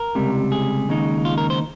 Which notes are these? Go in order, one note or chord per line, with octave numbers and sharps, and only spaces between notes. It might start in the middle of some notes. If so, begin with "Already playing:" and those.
Already playing: A#4
C#2 C3 G3
G#4
D#2 C#3 G#3 D#4
F4
A#4
C5